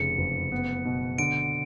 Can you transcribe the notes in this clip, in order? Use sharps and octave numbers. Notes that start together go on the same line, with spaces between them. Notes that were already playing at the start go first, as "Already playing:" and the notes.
Already playing: F1 C#3 C#7
F#1
B3
B2
D3 D7